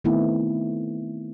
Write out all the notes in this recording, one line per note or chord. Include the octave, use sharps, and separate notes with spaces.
D#3 A3 B3 C4 D#4 E4